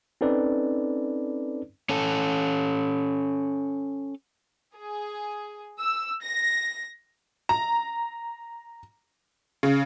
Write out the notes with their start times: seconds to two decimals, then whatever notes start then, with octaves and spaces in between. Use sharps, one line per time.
0.21 C4 C#4 D#4 A4 B4 D5
1.89 C#4 A4
4.76 G#4
5.80 E6
6.23 A#6
7.49 A#5
9.63 C#3